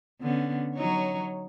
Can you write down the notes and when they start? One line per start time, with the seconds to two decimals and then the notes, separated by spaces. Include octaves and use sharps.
0.22 D3 B3 C#4
0.75 F#3 D#4 C#5